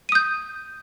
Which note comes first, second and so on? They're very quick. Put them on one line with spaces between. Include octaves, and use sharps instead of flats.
D#7 D#6 G6